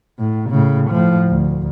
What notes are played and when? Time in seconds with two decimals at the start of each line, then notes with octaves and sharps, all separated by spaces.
0.19 A2
0.50 A2 C#3
0.90 A2 F3
1.29 D2